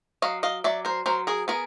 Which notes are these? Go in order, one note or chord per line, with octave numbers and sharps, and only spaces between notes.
F#3 D#5 F5
D#5 F5
F#3 D5 E5
A#4 C5
F#3 A#4 C5
G#4 A#4
B3 G#4 A#4